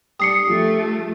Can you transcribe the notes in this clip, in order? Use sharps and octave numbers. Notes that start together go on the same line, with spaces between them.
G3 D4 D#6 C7 C#7
F3 A3